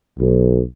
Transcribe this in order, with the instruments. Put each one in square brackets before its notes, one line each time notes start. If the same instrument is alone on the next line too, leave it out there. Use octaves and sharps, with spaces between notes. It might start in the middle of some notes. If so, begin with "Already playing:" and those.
[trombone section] B1